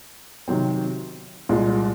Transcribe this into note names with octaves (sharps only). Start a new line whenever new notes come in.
C3 D#3 F#3 C4
C2 A#2 G#3